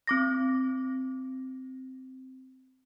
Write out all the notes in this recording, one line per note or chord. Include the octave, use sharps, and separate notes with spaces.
C4 D6 A#6